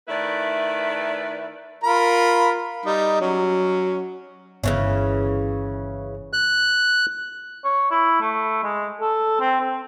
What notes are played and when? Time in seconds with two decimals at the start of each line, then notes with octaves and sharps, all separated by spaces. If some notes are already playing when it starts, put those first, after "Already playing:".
0.08 D#3 A3 E4 B4 D5
1.84 F4 A#4 B5
2.86 G3 D#4
3.20 F#3 C#4
4.64 G1 C#3 E3 C#4
6.33 F#6
7.64 C#5
7.91 E4
8.21 A3
8.63 G#3
9.01 A4
9.40 C4
9.60 C4